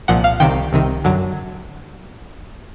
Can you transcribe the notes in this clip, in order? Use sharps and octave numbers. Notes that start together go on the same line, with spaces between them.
C2 A#2 F3 F#5
F5
C2 C3 D#3 G5
C2 C3 D#3
F#2 D3 F#3